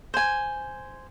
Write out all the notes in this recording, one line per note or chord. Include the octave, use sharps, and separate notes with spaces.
C5 G#5